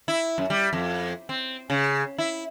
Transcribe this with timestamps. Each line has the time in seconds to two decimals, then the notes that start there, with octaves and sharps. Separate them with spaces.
0.08 E4
0.38 F#2
0.50 G3
0.73 F2
1.29 C4
1.70 C#3
2.18 E4